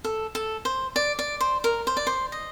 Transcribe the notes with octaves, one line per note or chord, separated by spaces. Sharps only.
A4
A4
C5
D5
D5
C5
A#4
C5
D5
C5
D#5